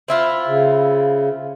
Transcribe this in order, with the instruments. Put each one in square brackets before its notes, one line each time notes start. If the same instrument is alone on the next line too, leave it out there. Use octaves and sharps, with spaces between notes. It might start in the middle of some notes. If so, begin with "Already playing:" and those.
[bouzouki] C4 E4 F4
[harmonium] C#3